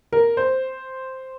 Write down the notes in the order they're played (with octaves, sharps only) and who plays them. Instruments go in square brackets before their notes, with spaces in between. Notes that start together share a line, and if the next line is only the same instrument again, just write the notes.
[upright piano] A#4
C5